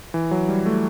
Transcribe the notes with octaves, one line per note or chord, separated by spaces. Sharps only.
E3
F#3
G3
A3